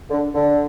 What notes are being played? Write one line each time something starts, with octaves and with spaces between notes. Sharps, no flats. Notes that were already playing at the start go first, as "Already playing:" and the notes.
D3
D3